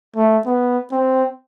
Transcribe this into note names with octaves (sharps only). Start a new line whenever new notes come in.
A3
B3
C4